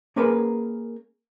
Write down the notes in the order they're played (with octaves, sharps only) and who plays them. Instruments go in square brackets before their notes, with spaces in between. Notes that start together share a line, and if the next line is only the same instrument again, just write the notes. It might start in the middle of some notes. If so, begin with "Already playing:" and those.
[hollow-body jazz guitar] A#3 C#4 G#4 A#4 B4